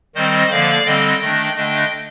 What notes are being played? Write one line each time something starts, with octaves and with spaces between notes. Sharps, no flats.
D#3 G3 C4 C5 D#5
D3 F3 A#3 D5 F5
D3 G3 C4 D#5 G5
D#3 A3 D4
D3 A3 D4 D#5 G5